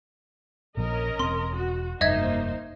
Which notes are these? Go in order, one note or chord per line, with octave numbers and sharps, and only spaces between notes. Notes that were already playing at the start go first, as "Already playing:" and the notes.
A#1 A#2 F3 C#4 A#4 D#5
E1 C4 C6
F#4
F1 G2 A#3 D#4 C5 D#5 E5 G#6